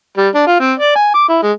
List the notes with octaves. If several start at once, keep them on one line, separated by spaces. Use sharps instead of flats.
G3
D4
F4
C4
D5
G#5
D6
E4
G#3